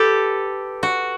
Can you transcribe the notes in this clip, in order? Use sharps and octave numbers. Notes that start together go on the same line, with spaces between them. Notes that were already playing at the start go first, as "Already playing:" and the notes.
Already playing: G4 A4 B4
F#4